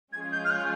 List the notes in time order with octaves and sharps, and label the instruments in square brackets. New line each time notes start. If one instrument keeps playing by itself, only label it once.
[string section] F3 G#3 C#4 F4 G#4 [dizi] G#6
[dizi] G6
F6
G6